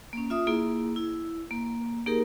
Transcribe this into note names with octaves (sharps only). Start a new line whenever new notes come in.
A#3 C#4
F4 E5 D#6
A#3 E4 G#4
E4
A#3
A#3 D#4 G4 G#4 A#4